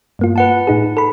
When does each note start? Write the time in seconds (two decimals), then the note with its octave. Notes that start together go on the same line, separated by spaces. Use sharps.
0.19 G2 A#3 F4
0.36 B4 F#5 A5
0.67 A2 D#4 G#4
0.97 A4 B5